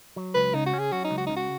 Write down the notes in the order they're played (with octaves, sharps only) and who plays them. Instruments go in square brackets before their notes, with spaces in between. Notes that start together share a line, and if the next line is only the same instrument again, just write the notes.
[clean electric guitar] F#3
[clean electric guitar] C#2 [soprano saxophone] B4
[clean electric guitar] C#3 [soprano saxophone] D#4
[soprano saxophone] F#4
[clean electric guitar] C#4
[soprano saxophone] G#4
[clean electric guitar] F#3 [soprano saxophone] F#4
[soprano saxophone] D#4
[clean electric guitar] C#2
[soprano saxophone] F#4
[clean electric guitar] C#3 [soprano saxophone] D#4
[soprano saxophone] F#4